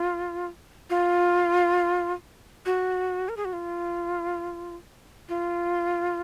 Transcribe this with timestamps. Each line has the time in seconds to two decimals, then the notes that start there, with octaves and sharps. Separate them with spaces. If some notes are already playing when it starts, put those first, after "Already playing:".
Already playing: F4
0.90 F4
2.66 F#4
3.29 A#4
3.37 G#4
3.45 F#4
3.53 F4
5.29 F4